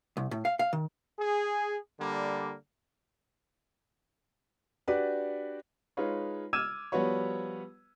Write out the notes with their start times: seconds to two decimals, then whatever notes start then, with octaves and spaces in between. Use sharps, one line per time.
0.17 C2
0.31 A2
0.45 F5
0.59 F5
0.73 D#3
1.19 G#4
2.00 D3 G3 A#3
4.88 D4 F#4 G4 B4 D5
5.97 G#3 D#4 F4 B4 C#5
6.53 D6 E6 F6 G#6 D#7 E7
6.92 F3 G3 B3 F#4 B4 C#5